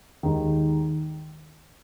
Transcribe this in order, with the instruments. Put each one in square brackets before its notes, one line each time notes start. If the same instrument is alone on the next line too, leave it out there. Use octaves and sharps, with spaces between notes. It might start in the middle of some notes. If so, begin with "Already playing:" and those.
[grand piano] D#2 D#3 G#3 D#4